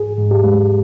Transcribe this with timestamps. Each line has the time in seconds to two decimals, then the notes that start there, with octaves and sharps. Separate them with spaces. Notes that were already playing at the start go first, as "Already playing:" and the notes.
Already playing: G#2 G#4
0.18 G#2
0.31 G4
0.44 G#3